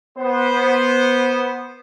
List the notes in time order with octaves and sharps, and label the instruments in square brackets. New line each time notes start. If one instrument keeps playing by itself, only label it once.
[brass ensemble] B3 C5